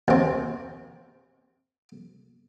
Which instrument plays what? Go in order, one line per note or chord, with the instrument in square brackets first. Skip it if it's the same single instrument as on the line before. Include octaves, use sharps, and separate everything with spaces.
[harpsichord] D#2 C4